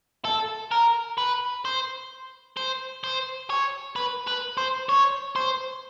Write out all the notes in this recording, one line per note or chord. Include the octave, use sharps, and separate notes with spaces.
A4
A#4
B4
C5
C5
C5
C#5
B4
B4
C5
C#5
C5